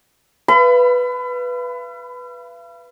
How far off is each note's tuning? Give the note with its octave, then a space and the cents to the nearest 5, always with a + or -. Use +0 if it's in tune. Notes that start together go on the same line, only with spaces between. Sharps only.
B4 +0 F5 -45 B5 +30